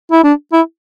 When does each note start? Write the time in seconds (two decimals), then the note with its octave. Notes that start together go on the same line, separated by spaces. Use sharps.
0.12 E4
0.24 D4
0.53 E4